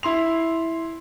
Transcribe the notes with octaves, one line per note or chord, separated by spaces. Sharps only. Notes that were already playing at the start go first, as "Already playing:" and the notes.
E4 C6 F7